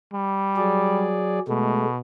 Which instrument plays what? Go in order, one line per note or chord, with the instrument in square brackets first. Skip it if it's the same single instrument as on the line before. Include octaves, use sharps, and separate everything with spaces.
[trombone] G3
[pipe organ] F#3 G#4 D5
[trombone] B2 [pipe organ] G#3 A3